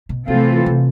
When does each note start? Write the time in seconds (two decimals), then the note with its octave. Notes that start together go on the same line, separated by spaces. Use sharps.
0.09 B2
0.28 C3 E3 A3 C4 F4 A4
0.66 C3